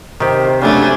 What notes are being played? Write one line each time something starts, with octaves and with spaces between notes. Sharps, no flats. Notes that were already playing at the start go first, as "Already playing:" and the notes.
C3 D#3 G4 C5
F#2 C#3 A3 D4 G#5